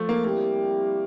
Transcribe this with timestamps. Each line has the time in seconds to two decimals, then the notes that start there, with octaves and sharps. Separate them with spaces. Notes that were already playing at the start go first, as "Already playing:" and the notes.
Already playing: F3 A3
0.09 A#3
0.24 G3 A#3 C4 E4 G4